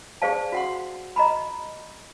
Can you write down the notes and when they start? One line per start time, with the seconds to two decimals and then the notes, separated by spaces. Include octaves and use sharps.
0.22 G#4 C5 D5 F5 A5
0.52 F#4 F#5 C6
1.16 D#5 A#5 B5